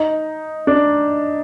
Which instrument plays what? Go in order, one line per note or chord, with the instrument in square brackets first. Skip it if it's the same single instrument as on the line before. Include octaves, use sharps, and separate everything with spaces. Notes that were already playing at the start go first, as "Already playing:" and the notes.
Already playing: [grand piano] D#4
D4